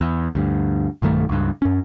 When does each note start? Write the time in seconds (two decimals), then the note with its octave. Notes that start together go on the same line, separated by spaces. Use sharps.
0.01 E2
0.35 D2 G2
1.02 B1 G2 D#3 A3
1.29 C#2 G2
1.62 F#2 C#4